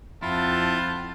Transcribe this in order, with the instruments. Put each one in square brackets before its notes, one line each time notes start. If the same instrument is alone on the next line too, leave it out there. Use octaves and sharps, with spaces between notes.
[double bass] F2 [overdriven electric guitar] E4 [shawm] F4 [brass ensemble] F#5 G5 A5